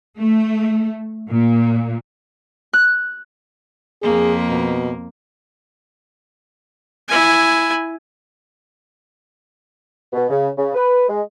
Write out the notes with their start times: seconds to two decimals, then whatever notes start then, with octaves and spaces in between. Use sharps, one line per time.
0.18 A3
1.29 A#2
2.73 F#6
4.02 F2 A#3 G#4
4.49 B2
7.08 E4 G#5
10.13 B2
10.30 C#3
10.57 C#3
10.74 B4
11.08 G#3